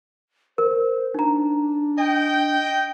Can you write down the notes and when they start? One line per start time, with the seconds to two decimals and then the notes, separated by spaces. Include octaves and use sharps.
0.58 A#4 C5
1.14 D4 D#4 A#5
1.98 D#5 G5